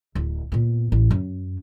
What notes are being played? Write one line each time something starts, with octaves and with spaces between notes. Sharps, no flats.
D1
A#2 B3
A1
F#2